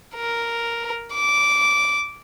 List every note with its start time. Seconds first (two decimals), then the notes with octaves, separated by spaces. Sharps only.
0.15 A#4
1.14 D6